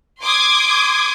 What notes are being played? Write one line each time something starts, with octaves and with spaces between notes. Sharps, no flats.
C6 D6 D#6 G#6